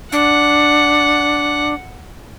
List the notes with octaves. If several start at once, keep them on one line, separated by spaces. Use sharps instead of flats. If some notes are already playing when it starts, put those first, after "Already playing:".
D4 F#5